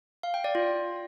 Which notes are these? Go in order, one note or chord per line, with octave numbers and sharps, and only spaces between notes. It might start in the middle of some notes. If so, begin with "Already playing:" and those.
F5
G5
D5
F4